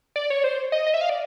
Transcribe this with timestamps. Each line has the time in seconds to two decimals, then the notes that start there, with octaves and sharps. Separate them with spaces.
0.16 D5
0.30 C#5
0.44 C5
0.72 D#5
0.87 D#5
0.94 E5
1.01 F5
1.09 D5